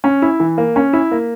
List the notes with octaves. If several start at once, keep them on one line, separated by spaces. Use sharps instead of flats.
C#4
E4
E3
A#3
C#4
E4
A#3